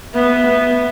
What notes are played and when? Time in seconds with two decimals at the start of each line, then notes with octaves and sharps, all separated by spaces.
0.14 B3 E5
0.47 B3